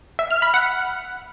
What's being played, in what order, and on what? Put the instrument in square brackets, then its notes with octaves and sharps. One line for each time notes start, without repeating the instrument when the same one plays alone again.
[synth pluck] E5
F6
B5
F#5